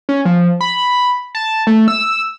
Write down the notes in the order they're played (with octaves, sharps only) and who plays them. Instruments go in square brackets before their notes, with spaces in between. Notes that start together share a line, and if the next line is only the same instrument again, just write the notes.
[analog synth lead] C#4
F3
B5
A5
A3
E6